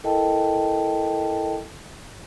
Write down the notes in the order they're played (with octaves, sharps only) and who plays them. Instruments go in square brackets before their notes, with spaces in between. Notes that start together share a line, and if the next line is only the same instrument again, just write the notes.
[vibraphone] E4 A4 A#4 D#5 G5 A5